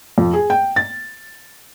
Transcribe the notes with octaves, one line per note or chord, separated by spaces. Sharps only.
F2
G#4
G5
A6